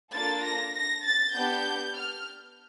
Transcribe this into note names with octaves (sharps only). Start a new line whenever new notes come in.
A#3 D4 F4 A4 A6
A#6
A#6
A6
B3 D4 G4 G6
F6